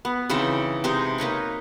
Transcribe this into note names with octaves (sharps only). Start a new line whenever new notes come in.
B3
C#3 E3 C4 D#4
C3 G#3 D#4 C5
A#3 D#4 B4 C#5